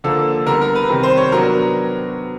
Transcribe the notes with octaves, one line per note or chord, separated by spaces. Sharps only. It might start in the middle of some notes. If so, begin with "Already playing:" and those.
D3 F3 A#3 A4
D3 G3 B3 A#4
A#4
B4
C3 D#3 G3 B4
C5
C#5
F#3 B3 D4 A#4
A#4